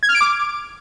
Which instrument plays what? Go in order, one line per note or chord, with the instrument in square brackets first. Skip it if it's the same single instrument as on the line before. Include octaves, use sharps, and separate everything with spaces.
[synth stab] G#6
F6
D7
D6